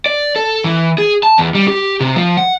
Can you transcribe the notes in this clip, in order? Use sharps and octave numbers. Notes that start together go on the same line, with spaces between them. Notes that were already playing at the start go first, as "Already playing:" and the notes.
D5
A4
E3
G#4
A5
E2
G3
G4
C3
F3
F#5